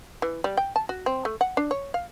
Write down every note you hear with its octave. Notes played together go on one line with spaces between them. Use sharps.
E3
G3
G5
A5
F#4
C4
A3
F#5
D4
C#5
F5